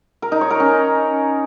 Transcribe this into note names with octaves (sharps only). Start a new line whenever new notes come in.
A#4
D#4
C#5
A#4
C#4